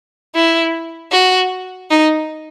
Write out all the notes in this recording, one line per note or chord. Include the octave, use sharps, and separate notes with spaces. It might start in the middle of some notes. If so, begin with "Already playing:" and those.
E4
F#4
D#4